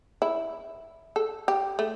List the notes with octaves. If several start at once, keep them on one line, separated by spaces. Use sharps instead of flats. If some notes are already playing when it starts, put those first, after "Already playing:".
E4
A4
G4
A3